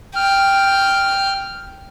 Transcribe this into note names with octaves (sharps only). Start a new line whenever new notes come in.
G5 F6